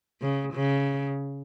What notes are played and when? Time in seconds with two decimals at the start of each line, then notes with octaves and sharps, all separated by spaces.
0.21 C#3
0.54 C#3